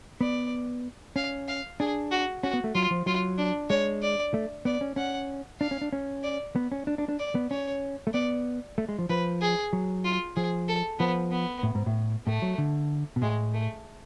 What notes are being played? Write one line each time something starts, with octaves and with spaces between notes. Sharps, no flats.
B3 D5
C#4 F5
F5
D4 G#4
F#4
C#4 F#4
B3
A3
F#3 F4
F3
F#3 F4
D4
G#3 C#5
D5
A3
B3 D5
C#4
C#4 F#5
D4 F5
C#4
D4
C#4
D5
B3
C#4
D4
D4
D4
D5
B3
C#4 C#5
A3
B3 D5
A3
G#3
F3
F3 B4
G#4
F#3
F4
F3 G#4
A4
F3 B3
B3
A2
G#2
A2
A2 A3
F#3
D3
B2
A2 G#3
A3